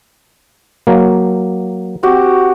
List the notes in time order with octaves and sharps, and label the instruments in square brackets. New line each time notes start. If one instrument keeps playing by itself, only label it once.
[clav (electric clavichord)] F#3 A#3
[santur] C4 F#4 G4